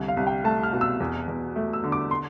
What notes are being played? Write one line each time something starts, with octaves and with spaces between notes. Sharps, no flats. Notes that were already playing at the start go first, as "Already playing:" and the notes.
Already playing: C2 D3 A3
F5
C2
G5
A3 A5
F6
B2
E6
E2
E2
A3
E6
D3
D6
C6